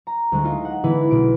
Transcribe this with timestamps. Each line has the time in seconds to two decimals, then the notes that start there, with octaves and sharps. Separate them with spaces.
0.07 A#5
0.32 D2 G#3
0.45 D#4 F4
0.65 F#5
0.84 D3 E3 B3 E4 G#4 B4
1.11 B1 B2 D7